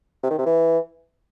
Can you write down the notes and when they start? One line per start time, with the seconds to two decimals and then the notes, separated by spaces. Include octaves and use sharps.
0.23 C3
0.31 D#3
0.38 C3
0.46 E3